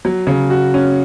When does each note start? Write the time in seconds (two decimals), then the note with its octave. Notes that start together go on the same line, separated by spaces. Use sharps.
0.05 F#3
0.27 C#3
0.50 F#4
0.74 C#4